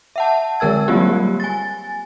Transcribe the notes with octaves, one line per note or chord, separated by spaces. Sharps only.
E5 F#5 A5
D3 G#3 A#4 E6 G#6
F#3 G3 A#3 C4 F4 G4
G#5 A6